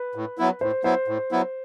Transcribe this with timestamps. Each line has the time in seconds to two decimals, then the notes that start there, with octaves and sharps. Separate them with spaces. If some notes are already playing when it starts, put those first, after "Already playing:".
Already playing: B4
0.15 A2
0.38 F#3 B3 E4
0.61 A2 C5
0.84 F#3 B3 E4 C5
1.08 A2
1.31 F#3 B3 E4